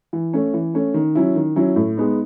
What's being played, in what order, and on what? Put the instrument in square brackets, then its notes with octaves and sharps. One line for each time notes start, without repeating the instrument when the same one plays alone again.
[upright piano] E3
A3 C#4
E3
A3 C#4
D#3
F#3 C#4 E4
D#3
F#3 C#4 E4
A2
G#3 B3 D#4